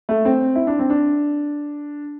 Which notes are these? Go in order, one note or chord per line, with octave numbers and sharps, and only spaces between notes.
A3
C4
E4
D4
C4
D4